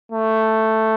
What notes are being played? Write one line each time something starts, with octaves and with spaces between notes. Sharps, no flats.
A3